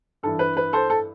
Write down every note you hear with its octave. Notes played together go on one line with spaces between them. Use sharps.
G2 E3 A4
B4
B4
A4 C5
A4